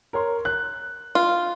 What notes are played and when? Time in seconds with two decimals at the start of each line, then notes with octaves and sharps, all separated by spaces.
0.13 A#4 C#5 C6
0.45 F#6
1.15 F4